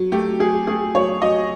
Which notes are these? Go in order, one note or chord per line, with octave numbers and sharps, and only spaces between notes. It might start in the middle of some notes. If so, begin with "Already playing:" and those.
Already playing: F#3
A3 G4
F#3 G#4
A3 G#4
F#3 C#5
F#3 D#5